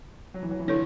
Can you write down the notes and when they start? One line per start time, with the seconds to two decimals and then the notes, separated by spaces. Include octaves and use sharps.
0.34 F#3
0.43 E3
0.51 F#3
0.60 E3
0.68 D3 E4 A4 C#5